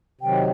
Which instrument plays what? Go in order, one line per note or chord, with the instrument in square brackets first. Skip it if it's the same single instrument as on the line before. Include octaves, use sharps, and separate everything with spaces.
[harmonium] C3 D#3 F#3 [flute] G5